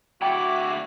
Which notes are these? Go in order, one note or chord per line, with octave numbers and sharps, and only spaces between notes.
D2 E4 F#4 G5 B5 D6